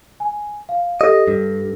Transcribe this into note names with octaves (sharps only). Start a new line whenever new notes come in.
G#5
F5
G4 A4 D#5 A#6
G2